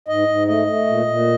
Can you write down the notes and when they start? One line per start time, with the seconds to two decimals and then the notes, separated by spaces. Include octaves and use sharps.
0.08 G#2 D#5
0.28 G#2
0.47 A3 D#5
0.67 A3
0.87 A#2
1.06 A#2